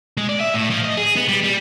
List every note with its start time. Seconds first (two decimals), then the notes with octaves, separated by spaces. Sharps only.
0.18 G#3
0.29 D5
0.41 E5
0.54 A2
0.71 F3
0.84 D#5
0.97 G#4
1.16 B3
1.29 G3
1.44 G3